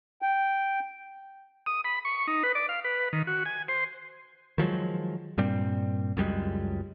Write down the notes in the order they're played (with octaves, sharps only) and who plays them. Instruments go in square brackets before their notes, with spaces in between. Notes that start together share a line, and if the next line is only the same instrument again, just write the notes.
[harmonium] G5
[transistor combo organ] D#6
B5
C#6
D#4
B4
D5
F5
B4
D#3
F#4
G#5
C5
[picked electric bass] D#3 F3 F#3 G#3
G2 A#2 G3 C4
C#2 F#2 G3 G#3